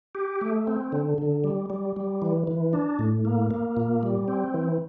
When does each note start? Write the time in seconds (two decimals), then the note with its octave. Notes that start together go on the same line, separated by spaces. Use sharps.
0.15 G4
0.41 A3
0.67 C4
0.92 D3
1.18 D3
1.44 G3
1.70 G3
1.96 G3
2.22 E3
2.47 E3
2.73 D4
2.99 A2
3.25 A#3
3.51 A#3
3.77 A#2
4.03 G3
4.28 C4
4.54 E3